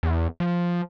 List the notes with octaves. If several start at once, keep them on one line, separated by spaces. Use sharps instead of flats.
E2
F3